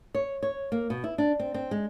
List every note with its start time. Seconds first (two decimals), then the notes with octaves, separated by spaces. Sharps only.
0.15 C#5
0.43 C#5
0.72 A#3
0.90 B2
1.04 E4
1.18 D4
1.40 C4
1.54 C4
1.71 G#3